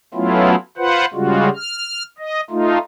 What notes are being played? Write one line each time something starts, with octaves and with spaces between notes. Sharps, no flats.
F#3 A3 B3 C#4 E4 F4
F4 B4 C5 F#5
C#3 G3 G#3 F4 F#4
F6
D#5
A3 D#4 F4